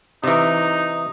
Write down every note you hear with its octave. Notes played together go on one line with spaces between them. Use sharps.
C3 E3 D#4